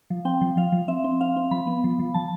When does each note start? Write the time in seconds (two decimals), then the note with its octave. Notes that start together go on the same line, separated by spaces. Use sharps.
0.10 F3
0.25 C4 G5
0.41 F3
0.57 F3 F5
0.72 F3
0.88 C4 E5
1.04 C4
1.21 C4 F5
1.36 C4
1.51 F3 B5
1.67 B3
1.84 F3
1.99 F3
2.14 F3 A5